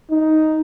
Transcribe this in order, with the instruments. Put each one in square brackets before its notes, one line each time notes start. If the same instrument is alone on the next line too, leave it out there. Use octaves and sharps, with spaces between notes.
[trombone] D#4